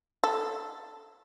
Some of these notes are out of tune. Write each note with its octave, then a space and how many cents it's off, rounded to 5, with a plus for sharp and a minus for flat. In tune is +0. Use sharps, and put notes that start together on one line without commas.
A4 +10